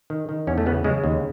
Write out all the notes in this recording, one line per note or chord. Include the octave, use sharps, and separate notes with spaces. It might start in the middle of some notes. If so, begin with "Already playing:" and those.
D#3
D#3
E2 C#4
A3
C#3 B3
C#3 G#3
D#2